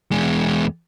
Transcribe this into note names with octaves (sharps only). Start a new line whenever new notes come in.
E2 G#3